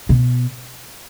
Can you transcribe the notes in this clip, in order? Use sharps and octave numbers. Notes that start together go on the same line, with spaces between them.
B2